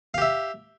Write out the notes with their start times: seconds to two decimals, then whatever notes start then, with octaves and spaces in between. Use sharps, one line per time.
0.14 F5
0.18 G4
0.22 E5